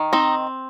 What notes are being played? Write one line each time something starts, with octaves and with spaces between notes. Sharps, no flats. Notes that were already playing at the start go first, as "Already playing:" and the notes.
Already playing: D#3
C4 D#4